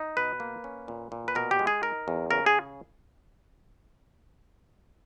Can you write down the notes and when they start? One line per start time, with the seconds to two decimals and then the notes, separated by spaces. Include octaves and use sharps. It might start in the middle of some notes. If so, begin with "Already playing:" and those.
Already playing: D#4
0.17 B2 B4
0.40 A#3
0.64 C#4
0.88 A#2
1.12 A#2
1.28 B4
1.35 B2 A#4
1.51 G4
1.59 G#3
1.67 G#4
1.83 D#4 A#4
2.08 E2
2.31 C#3 A#4
2.46 G#4